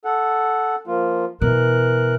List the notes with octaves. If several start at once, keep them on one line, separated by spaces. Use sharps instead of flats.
A4 F#5
F3 A#3 F4
B2 E3 A#4 F#6